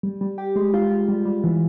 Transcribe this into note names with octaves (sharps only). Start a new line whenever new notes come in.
G3
G3
G4
G#3
F4
F4
G3
G3
E3